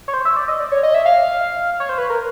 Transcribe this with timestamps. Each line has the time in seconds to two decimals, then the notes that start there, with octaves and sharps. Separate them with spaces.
0.08 C#5
0.14 C5
0.25 E5
0.37 D5
0.48 D#5
0.60 D5
0.72 C#5
0.83 D#5
0.94 E5
1.06 F5
1.80 C#5
1.89 C5
1.98 B4
2.10 A#4